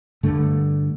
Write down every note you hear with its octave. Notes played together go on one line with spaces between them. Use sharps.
G2 D3 A3